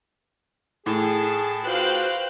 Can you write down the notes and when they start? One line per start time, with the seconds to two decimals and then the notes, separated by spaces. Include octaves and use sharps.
0.86 A2 G#4 A5
1.64 F4 F#4 B4 C5 F5 G5 F#6